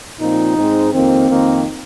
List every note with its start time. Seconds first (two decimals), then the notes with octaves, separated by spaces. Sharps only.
0.20 A#2 F3 C4 D#4
0.57 G#2 G#3 C4
0.93 F2 D#3 A#3 C4
1.29 F2 D#3 A#3